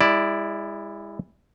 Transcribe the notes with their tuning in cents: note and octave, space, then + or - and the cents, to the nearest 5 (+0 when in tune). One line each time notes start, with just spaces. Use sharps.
G#3 -35 E4 +0 D5 +0